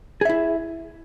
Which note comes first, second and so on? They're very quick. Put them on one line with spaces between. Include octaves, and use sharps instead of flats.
G#4 E5 E4